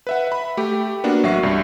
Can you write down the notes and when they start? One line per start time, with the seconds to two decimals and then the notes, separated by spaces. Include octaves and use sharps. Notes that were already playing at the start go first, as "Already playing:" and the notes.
0.07 B4 E5 F#5
0.27 E5 B5
0.57 A3 G4
1.04 A#3 B3 D4 F#4
1.23 A1 F#3 F#4 E5 C#6 C7
1.43 C2 G2